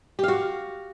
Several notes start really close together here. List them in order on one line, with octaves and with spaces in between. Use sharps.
G4 F5 F#4